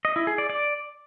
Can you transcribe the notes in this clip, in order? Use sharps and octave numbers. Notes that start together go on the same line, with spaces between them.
D#5
E4
G#4
D5
D5